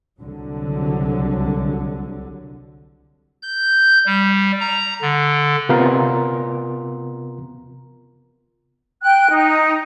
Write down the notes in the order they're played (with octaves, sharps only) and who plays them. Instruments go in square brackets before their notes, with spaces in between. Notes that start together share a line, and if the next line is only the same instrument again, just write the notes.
[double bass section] C2 D3 F#3
[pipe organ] G6
G3
A#5
D3
[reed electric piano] C3 B3 F4 A#4 A#5 C6
[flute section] G5 F#6
D#4